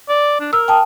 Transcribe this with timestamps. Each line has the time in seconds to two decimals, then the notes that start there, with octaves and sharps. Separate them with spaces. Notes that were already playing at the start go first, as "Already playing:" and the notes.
0.09 D5
0.40 D4
0.53 A#4 E6
0.68 G5 A5 D#6